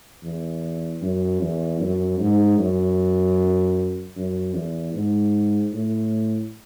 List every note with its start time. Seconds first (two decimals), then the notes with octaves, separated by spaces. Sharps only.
0.23 E2
1.02 F#2
1.41 E2
1.81 F#2
2.20 G#2
2.58 F#2
4.16 F#2
4.55 E2
4.95 G#2
5.73 A2